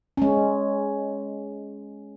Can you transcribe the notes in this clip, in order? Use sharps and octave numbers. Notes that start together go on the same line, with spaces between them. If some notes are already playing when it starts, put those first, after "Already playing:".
G#3 C#4